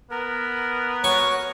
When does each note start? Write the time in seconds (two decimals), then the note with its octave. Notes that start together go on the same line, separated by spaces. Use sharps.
0.11 B3 A#4
1.04 F#4 C#5 G#5 C#6